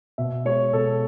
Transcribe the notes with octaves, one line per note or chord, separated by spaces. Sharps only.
B2 E5
G#3 C#5
B2 A4